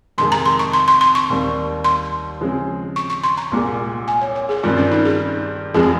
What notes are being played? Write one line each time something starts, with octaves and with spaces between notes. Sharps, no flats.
F2 C3 D#3 G#3 C6
A#5
C6
C#6
C6
C6
C6
C#6
D#2 D#3 G3 C4
C6
C#3 F3 G#3 C4
C#6
C#6
C6
A#5
C2 A#2 G#3
G#5
C#5
C#5
G#4
G2 D#3 G3 C4 F4
C#4
D#4
G#4
F1 F2 C3 F3 G#3 G#4